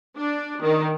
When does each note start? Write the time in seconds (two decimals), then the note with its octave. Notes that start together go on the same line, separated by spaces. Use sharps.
0.18 D4
0.62 D#3